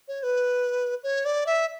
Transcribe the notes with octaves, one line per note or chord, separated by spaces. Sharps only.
C#5
B4
C#5
D5
E5